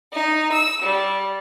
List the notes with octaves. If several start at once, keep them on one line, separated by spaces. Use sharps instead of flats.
D#4
E6
G3